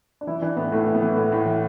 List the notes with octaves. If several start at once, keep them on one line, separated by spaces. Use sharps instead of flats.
D4
E3 E4
E3 D4
A2 B3
A2 A3
E3
B3
E3
A2
A2
E3